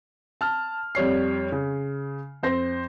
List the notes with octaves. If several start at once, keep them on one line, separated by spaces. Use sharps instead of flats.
A5 F6
F2 G3 C#5 C7
C#3
F2 C5 A#6